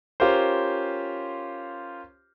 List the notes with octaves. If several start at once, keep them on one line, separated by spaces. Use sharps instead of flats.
C#4 F4 G4 A#4 C5